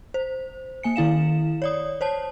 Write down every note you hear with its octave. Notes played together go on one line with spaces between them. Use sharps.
C5
A#3 G#5 C#7
D#3 E4 F5 E7
C#5 D5 D#6
C5 C#5 A5